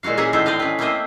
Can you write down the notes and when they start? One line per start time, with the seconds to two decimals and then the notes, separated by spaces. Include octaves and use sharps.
0.03 A#2 G#3 E4 F#4 F5
0.17 A#3 C#4 G#4 E5 F#5 A#5
0.33 A2 D#4 A4 C5 E5
0.46 C4 C5 D5 D#5 F5
0.60 C#4 B4
0.79 A3 A#3 C4 C5 D#5 E5